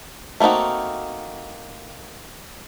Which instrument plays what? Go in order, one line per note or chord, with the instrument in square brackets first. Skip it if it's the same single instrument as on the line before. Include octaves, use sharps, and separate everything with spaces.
[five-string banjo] A3 A#3 C4 D#4 F#4